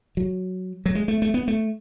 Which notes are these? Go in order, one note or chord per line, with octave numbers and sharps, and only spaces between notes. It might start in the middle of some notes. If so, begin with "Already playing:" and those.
F#3
F#3
G#3
A3
A3
B3
A3